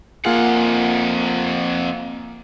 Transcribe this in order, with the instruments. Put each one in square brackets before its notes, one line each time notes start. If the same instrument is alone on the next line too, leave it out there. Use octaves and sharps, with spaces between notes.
[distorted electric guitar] F2 F#5 [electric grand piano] A#3 F4 G#4